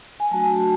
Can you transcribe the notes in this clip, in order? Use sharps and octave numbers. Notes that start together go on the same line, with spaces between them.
G#5
F#3 A3 D4 F#4 A5